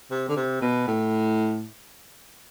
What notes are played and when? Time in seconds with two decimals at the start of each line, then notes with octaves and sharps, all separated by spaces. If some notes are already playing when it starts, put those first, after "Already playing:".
0.11 C3
0.28 D3
0.36 C3
0.61 B2
0.87 A2